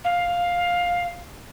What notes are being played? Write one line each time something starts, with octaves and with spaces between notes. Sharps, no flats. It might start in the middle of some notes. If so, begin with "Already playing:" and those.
F5